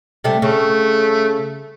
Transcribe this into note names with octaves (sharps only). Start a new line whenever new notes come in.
C3 G3 A3
C#3 A3